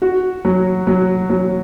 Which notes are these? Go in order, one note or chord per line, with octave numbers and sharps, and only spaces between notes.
F#4
F#3
F#3
F#3